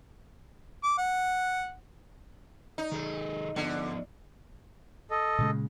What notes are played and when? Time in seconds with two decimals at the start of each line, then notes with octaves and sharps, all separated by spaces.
0.83 D6
0.98 F#5
2.78 D#4
2.92 D#3 G#4 A4
3.56 D3 F3 B3
5.11 A4 D#5
5.39 A#2 C#3 G#3